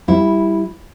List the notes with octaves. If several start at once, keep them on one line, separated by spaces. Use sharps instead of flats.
G3 E4